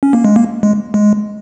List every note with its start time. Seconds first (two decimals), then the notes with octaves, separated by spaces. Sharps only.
0.03 C#4
0.13 A#3
0.25 G#3
0.36 A#3
0.63 G#3
0.94 G#3